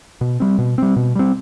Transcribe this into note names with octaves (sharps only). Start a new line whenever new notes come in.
B2
G3 C4
B2
G3 C4
B2
G3 C4